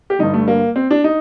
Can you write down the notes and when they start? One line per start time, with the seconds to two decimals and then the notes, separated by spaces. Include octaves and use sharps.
0.10 G4
0.19 G2 D3 G3 D#4
0.34 A3
0.48 A#3
0.76 C4
0.91 D4
1.04 D#4